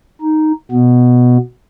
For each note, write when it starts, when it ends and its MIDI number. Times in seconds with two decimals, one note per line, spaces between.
0.22 0.52 63
0.72 1.37 47
0.72 1.37 59